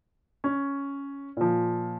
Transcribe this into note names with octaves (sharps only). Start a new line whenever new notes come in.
C#4
A#2 F3